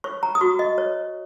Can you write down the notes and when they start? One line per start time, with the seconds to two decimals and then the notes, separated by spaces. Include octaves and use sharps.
0.04 C#5 C#6
0.23 A#5
0.35 D#6
0.41 F#4 C#6
0.59 D#5
0.78 C#5